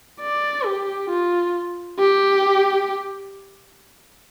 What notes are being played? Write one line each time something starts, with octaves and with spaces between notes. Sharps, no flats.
D5
G4
F4
G4